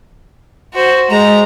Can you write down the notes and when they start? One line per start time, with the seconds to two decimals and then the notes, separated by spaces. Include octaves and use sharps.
0.73 F#4 C5
1.10 G#3 A#5